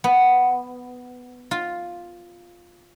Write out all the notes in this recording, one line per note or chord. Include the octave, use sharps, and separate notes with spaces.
B3
F4